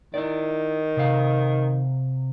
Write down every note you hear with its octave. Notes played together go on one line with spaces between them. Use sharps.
D#3 E4 D5
C3 F5